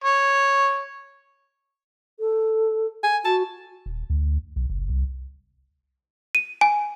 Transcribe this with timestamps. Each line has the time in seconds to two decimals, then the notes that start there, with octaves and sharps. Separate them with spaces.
0.04 C#5
2.20 A4
3.04 G#5
3.25 F#4 A5
3.86 D#1
4.10 D2
4.56 B1
4.70 F#1
4.89 C2
6.35 D#7
6.61 G#5